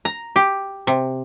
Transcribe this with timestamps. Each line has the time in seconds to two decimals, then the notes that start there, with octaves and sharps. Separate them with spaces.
0.05 A#5
0.36 G4
0.87 C3